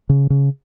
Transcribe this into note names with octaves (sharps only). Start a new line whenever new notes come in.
C#3
C#3